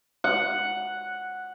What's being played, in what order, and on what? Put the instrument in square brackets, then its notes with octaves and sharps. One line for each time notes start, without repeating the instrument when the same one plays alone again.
[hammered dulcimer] F#5